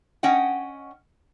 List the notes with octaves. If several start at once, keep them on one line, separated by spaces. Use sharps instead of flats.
C#4 D#5 F#5 G5